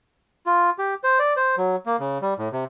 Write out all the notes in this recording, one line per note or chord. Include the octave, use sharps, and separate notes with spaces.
F4
G4
C5
D5
C5
F#3
A#3
C#3
G3
A2
C3